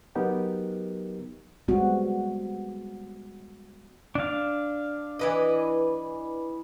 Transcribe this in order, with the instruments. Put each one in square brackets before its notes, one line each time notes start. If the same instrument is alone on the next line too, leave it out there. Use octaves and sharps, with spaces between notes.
[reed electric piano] F#3 B3 D#4 G4 A#4
[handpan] G3 G#3 B3 C4 F#4
[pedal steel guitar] D4 F5
[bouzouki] E3 B4 D#5